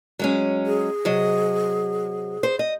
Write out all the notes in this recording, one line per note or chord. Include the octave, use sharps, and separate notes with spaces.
F#3 G#3 C#4
G#4
C3 F#3 D#5
C5
D#5